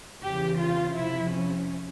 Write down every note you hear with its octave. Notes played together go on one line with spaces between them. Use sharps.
E2 C#3 E3 G4
F4
F2 C3 F3 E4
C#4